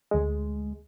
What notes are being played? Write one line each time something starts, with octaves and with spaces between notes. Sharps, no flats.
D2 G#3